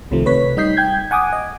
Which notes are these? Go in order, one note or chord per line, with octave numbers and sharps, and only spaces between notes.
C2 C3 D#3 F3 A3
C3 A3 B4 C#5 B6
G3 D#4 D#5 G6 B6 C7
G5 G6 G#6
F#5 G#5 D6 D#6
D#5